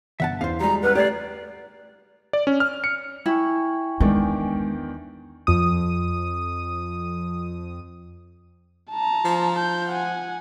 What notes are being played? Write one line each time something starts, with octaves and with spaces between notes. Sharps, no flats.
G1 E5 F#5 A5
E2 C5 F5 C7
G3 G#3 F#4 A#5
B4 F#5 F6 F#6
A3 G4 D5 G#6 C7
D5
C#4
F6
C#7
E4 G5 G#5 C#6
E2 D#3 G#3 D4
F2 D#6
A5 A#5
F3
G6
F#5 G#5